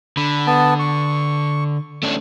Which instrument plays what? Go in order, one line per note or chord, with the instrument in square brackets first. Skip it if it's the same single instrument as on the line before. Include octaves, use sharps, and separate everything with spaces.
[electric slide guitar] D3 [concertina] B5
[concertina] B3 A5
C#6
[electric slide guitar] A3 C#4 D4